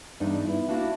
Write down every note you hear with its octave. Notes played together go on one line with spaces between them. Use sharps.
E2 G2 D4 D#4
B3 E4
A#3 D4 E4 F#4 F5